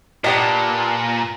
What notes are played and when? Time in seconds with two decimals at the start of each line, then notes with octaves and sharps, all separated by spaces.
0.24 A#2 B3 D4 G4 D#5